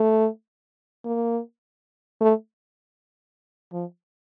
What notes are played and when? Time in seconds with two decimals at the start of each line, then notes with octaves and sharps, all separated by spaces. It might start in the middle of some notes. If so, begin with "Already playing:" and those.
Already playing: A3
1.05 A#3
2.21 A3
3.72 F3